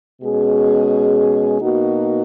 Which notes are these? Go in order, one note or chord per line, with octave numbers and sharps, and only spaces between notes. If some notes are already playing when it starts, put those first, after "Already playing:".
B2 G#3 C#4 G#4
B2 A#3 D#4 F#4